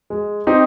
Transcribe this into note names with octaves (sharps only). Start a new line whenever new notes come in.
G#3
C4 D#4 G4